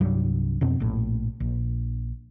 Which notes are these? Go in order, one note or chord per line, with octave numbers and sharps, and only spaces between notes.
C2 G2 F#3 G3
F2 B2 C4
A#1 A2
A#1